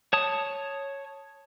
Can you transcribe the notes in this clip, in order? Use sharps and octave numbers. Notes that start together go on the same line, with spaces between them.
C#5 A5 D#6